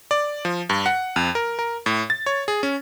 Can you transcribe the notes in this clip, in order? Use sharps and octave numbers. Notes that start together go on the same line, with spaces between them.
D5
F3
G2
F#5
F2
A#4
A#4
A2
A6
C#5
G#4
C#4